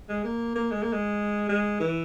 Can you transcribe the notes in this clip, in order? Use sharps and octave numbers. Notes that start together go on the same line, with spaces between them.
G#3
A#3
A#3
G#3
A#3
G#3
G#3
E3